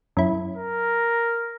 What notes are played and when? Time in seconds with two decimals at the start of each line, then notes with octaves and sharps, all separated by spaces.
0.17 F#2 E4
0.56 A#4